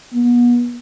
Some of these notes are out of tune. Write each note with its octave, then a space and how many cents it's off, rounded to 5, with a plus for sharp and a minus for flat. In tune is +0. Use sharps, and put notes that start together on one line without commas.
B3 -35